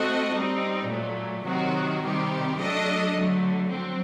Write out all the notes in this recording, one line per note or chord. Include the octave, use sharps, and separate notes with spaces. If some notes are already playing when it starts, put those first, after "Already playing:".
Already playing: A3 C4 F#4 A4 D#5
G3 C4 D#4
A#2 F#3 A3
C3 D#3 F#3 C4 F#4
C3 D#3 G3 C4 G4
F#3 A3 D4 A4 D#5
D3 F#3 A3
F#3 C4